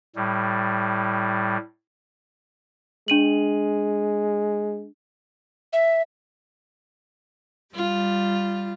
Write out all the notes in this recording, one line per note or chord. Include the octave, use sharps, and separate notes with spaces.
A2 G3
G#3 D4 D#7 F#7
E5
G3 F4